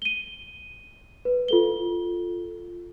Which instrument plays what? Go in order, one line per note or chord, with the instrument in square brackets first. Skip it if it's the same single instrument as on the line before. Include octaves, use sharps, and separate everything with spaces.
[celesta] D#7 G7
B4
F4 A4 G7